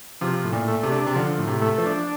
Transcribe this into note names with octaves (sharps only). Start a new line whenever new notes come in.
C3 F3
A2
A#2
A3
C3
D4
C3
D3 F3
A2
C3
A3
F3
D4